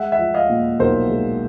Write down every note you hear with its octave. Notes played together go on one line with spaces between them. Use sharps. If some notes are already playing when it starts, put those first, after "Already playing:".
Already playing: G#3 E5 F#5
E5 F#5
F3
D#5 F5
A#2
B1 A#4 C5
G#3